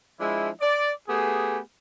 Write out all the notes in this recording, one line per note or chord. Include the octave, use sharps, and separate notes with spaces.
F3 G#3 D4 E4
D5
A3 B3 G4 G#4